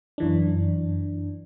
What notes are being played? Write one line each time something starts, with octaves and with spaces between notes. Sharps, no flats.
F#2 E3 D4